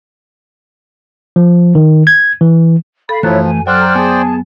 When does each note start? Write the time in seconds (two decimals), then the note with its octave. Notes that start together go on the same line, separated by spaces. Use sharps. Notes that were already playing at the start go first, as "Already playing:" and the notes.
1.36 F3
1.75 D#3
2.07 G#6
2.41 E3
3.09 A4 F5 B5
3.23 F#2 E3 F3 A3 E4 C#5 F#6
3.43 G#5
3.67 F#3 A4 C5 D5 G5 F6 F#6
3.81 A#5
3.95 B3 G#4 G#5 A5